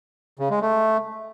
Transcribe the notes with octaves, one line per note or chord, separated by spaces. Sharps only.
C#3
G#3
A3